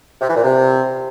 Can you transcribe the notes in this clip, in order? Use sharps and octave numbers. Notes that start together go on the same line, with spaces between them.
C3
E3
A#2
C3